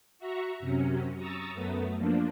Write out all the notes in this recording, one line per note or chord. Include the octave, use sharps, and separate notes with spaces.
F#4 E5 A#5 C#6
F#2 C3 F#3 C#4
A#5 C#6 D#6 E6 A6
F#2 A3 B3
F3 A#3 D4